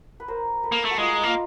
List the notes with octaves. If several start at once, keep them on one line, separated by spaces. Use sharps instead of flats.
B4
A#4 C5
A4 B4
A#3
A3
F#4
G#3 D#4 F4
A#3 F4